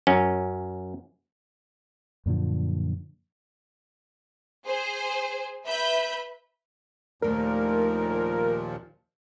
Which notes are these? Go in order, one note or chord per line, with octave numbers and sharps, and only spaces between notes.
F#2 C#4
F#2 A#2 D3 F3
G#4 C5
B4 E5 B5 G6
D#2 A#2 F3 A3 D4 A#4